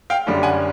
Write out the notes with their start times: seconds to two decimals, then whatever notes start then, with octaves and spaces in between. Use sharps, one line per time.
0.10 F5 G5
0.27 F#1 F#2 D3 G3
0.43 F#5 G#5